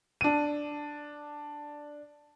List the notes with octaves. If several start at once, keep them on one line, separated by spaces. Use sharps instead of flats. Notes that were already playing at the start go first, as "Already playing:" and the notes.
D4 D#7